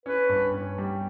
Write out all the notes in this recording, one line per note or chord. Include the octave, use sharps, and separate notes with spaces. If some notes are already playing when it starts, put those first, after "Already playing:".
C#4 B4
G2
C#4
G3